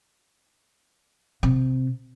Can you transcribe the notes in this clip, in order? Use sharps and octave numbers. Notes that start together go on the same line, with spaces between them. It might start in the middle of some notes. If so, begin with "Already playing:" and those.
C3